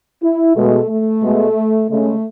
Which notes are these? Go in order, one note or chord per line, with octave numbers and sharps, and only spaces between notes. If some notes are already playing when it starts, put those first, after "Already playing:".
E4
B2 G#3 A3
A3
B2 G#3
C#3 G#3 A3